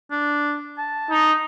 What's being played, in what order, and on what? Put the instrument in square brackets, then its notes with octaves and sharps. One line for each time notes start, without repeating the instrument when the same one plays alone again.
[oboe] D4
A5
[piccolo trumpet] D#4